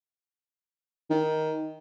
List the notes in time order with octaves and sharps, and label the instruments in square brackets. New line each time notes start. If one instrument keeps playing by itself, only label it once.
[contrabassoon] D#3